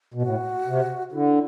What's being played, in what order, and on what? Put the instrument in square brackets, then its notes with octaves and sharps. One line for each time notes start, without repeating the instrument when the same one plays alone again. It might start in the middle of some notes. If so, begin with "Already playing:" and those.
[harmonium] B2
[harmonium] A2 [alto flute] F#4
[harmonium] C3
[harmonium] D3 [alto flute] E4